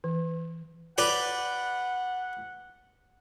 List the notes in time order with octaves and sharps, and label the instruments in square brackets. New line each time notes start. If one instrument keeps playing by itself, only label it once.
[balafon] E3
[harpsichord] G4 B4 D5 [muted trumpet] F#5